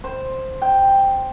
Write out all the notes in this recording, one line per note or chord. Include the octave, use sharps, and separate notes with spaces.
C5
G5